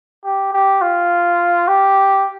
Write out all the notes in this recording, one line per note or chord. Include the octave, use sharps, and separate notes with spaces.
G4
G4
F4
G4